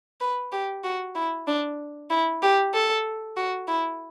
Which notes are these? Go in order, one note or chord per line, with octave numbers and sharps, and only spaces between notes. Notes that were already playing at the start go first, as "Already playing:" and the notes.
B4
G4
F#4
E4
D4
E4
G4
A4
F#4
E4